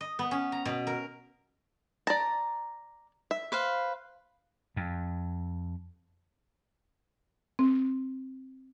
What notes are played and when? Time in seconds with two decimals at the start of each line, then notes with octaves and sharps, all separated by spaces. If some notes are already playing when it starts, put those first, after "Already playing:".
0.01 D#5
0.19 B3
0.31 C#4
0.52 A#5
0.65 B2
0.87 A#4
2.07 D5 A5 A#5
3.31 E5
3.52 B4 C5 F5
4.76 F2
7.59 C4